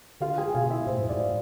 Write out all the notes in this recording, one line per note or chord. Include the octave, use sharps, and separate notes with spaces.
D3 F4 F5
G#4 G#5
B2 F4 F5
E4 E5
A2 C5
F2
G#2 D5
A2